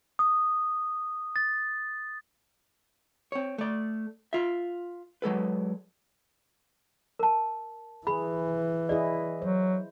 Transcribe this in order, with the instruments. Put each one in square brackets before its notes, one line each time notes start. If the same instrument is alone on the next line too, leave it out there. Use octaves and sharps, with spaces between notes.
[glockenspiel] D#6
A6
[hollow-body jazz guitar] C4 C#5
A3 D5
F4 E5
F#3 G#3 A4 B4
[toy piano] A#4 A5
[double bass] E3 [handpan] G#4 [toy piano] B5
[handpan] E4 G#4 D#5 [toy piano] D5
[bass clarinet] F#3 [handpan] C5